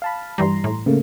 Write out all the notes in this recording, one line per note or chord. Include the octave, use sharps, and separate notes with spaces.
F5 A5 B5
G2 E3 G3 A#5 C6
A2
C#3 A3 A#3